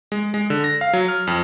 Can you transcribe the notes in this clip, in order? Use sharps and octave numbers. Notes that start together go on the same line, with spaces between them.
G#3
G#3
D3
A#6
F5
F#3
F6
F2